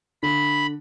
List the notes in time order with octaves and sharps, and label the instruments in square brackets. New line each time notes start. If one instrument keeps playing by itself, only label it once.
[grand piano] D3 [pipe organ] B5